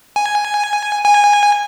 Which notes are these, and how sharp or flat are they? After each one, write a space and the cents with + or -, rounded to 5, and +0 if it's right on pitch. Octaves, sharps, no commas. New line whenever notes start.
G#5 +0
G#5 -15